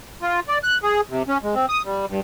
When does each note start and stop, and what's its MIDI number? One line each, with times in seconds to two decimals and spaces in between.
0.22 0.40 65
0.48 0.58 74
0.63 0.78 90
0.83 1.01 68
1.10 1.23 48
1.28 1.38 61
1.43 1.55 56
1.55 1.66 60
1.69 1.82 87
1.85 2.06 55
2.08 2.20 43